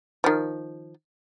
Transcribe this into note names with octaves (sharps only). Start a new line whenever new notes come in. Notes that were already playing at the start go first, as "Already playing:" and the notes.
D#3 F3